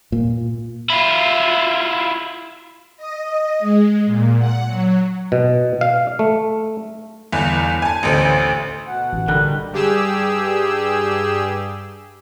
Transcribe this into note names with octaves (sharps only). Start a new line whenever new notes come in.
A#2
E4 F4
D#5
G#3
A#2
F#5
F#3
B2
F5
A3
G1 E2
G#5 A5
A1 D2 C5
B2 F#5
A1
D3 D#3 G3 F#6
G2 G4 G#4 E6